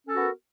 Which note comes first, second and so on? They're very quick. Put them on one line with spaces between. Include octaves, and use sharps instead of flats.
C#4 A4 F#4 B3 A#4